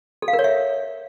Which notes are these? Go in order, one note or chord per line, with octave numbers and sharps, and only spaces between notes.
A4
F5
A#4
C#5
E5